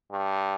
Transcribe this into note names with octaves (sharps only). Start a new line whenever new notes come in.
G2